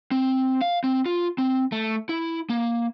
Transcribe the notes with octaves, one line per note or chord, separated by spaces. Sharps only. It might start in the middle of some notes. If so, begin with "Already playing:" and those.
C4
F5
C4
F4
C4
A3
E4
A#3